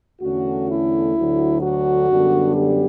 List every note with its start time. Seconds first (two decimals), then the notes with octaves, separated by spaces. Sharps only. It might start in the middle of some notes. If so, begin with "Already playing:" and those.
0.22 E2 D3 A3 C#4 F#4
0.69 E4
1.15 D2 D3 F#3
1.62 F#4
2.09 F#2 D3 G3 B3 D4
2.56 G4